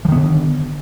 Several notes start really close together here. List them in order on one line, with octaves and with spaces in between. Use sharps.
F3 D#3 B3 D3